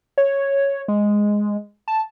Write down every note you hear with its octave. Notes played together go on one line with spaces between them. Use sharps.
C#5
G#3
A5